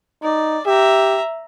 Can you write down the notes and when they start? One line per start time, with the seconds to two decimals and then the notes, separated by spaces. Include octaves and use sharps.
0.23 D#4 D5
0.66 G4 E5 A#5